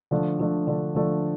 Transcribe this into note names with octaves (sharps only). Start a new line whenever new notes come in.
D3 F3 A3 D4
D3 F3 A3 D4
D3 F3 A3 D4
D3 F3 A3 D4